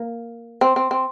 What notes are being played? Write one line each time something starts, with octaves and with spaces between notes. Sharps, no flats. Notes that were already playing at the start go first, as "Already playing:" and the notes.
Already playing: A#3
C4
C4
C4